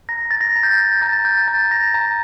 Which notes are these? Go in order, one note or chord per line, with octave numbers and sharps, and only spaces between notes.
A#5 A#6
A6
A#6
A#5
G6
A6
A#5 A6
G6
A#5 A6
A#6
A#5